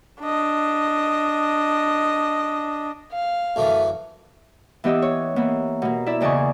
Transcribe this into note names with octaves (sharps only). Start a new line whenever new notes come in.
D4 D#5
F5
F#2 D3 E3 A3
E3 B3 G4 D#5 E6
C#5
E3 A#3 B3
B2 A#3
E4 D5 E5
E2 C#3 D5 D#5 G#5 C#6